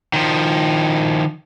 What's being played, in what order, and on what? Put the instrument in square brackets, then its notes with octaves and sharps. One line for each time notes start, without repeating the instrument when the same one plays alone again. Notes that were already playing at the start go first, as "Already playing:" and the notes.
[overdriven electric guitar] D#3 F3